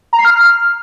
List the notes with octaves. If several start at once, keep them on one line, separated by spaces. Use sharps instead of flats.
A#5
C7
F6